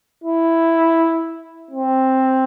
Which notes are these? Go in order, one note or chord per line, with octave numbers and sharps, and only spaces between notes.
E4
C4